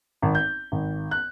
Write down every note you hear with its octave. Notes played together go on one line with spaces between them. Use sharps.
G#1
G6
G#1
F#6